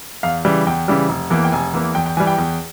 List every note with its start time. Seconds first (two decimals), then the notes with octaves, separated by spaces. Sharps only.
0.23 E2 F5
0.45 C#3 E3 G3
0.67 E2 G5
0.88 C#3 E3 G3
1.09 F1
1.30 E2 E3 A#3
1.44 G5
1.52 F1 G#5
1.73 E2 E3 A#3
1.95 E2 G5
2.06 G5
2.17 E3 G#5
2.20 G3
2.27 G5
2.38 E2